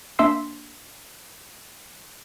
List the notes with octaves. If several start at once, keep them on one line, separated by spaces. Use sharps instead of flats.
A#3 D4 E5 C6 E6 C7